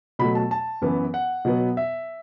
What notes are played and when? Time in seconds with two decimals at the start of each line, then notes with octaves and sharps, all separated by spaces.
0.19 B2 F#3 A3 B5
0.35 A5
0.51 A5
0.81 F#2 E3 B3
1.14 F#5
1.45 B2 F#3 B3
1.77 E5